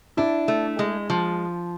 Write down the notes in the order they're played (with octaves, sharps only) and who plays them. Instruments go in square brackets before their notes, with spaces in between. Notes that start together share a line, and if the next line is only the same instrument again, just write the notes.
[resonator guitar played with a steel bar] D4 [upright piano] E4
[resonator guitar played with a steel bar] A3
G#3
F3